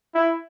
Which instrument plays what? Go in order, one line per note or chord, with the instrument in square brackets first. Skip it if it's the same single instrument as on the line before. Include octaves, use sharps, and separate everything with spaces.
[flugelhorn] E4